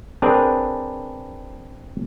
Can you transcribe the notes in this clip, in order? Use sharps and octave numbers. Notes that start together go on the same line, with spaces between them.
C4 D4 G#4 A#4 B4